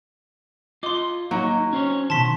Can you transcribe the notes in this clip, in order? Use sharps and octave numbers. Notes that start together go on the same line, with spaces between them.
F4 D#5 C6 D6
F#3 A#3 D#4
C#4 C5 C#5
B2 D#3 A5 C6 B6